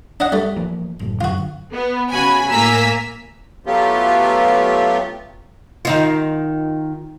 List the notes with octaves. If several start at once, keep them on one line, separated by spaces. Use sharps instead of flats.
D4 D#5 F#5
G3 A3
E3 F3 A#3
F#1 A2
F#2 D3 F#3 F4 F#4
B3
C#3 F#4 G#5 B5
A2 A#3 G#5 A#5 E6 B6
F#3 A3 B3 F4 G4
D#3 D#4 F4